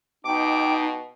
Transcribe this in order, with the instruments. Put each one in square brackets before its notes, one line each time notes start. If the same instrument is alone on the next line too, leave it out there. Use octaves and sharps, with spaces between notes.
[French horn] B2 [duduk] D#4 [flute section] G5 [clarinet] D6